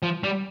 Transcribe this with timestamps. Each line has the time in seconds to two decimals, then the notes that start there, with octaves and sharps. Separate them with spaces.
0.03 F3
0.23 G3